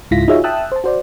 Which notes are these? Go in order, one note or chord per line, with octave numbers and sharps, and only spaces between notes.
C#2 G#2 E4 F4 A#6 B6
D#4 F4 F#4 G#4 C#5 E5
E5 G5 A5 D#6 E6 F#6
C5 A5
F#4 C5 D5